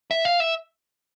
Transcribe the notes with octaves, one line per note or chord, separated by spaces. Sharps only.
E5
F5
E5